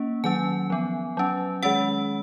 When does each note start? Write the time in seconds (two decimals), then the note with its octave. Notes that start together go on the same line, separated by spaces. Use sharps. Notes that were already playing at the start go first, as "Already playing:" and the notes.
Already playing: A#3 C#4
0.24 D#3 F#3 C#4 G#5
0.70 F3 B3
1.17 F#3 C#4
1.63 D#3 G#3 C#4 F#5